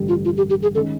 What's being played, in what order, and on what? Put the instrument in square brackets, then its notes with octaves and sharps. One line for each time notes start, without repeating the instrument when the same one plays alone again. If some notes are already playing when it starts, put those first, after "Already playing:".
Already playing: [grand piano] A1 G2 D3 G3
[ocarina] F4
F4
G4
G4
G#4
[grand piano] D#3 G#3 C#4 [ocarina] A4